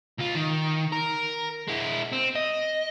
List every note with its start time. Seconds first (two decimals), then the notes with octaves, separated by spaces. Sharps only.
0.18 C#2 F4
0.35 D#3
0.92 A#4
1.68 G#3 E4
2.12 C4
2.35 D#5